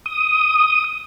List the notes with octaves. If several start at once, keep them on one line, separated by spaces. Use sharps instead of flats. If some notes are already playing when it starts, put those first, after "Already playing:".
D#6